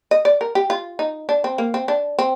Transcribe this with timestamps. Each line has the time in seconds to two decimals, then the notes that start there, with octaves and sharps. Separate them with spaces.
0.11 D#5
0.25 D5
0.41 A#4
0.55 G4
0.70 F4
0.99 D#4
1.29 D4
1.44 C4
1.58 A#3
1.74 C4
1.88 D4
2.19 C4